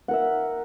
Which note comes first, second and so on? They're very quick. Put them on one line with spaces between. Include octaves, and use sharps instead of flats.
F#5 A#4 E5